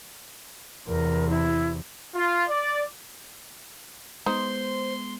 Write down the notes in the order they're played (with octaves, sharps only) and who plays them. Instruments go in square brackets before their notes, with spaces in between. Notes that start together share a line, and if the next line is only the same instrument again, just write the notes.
[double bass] E2 C3 [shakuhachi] A#4
[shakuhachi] E4
[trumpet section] F4
D5
[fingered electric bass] G#3 B3 [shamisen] D#4 [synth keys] C5 [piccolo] C6